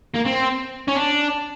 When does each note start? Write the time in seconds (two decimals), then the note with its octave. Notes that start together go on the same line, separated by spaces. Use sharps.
0.14 A#3
0.25 C4
0.88 C#4
0.95 D4